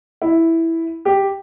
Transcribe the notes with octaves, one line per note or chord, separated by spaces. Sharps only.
E4
G4